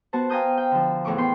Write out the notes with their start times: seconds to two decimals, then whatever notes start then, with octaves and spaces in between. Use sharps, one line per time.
0.13 B3 F#4 C5 A5
0.30 F5 G5 G#5 A#5 D#6 G6
0.58 G5
0.71 D3 F3
1.05 E2 A2 C#6 D6
1.18 A3 B3 G5 C6